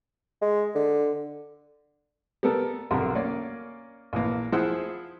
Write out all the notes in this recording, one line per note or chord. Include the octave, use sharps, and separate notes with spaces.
G#3
D3
G3 B3 A4 A#4
B1 F2 D3 G3 A#4
A#3 C#4 D5
A#1 E3 A#3
F3 E4 G#4 C5 F#5 E6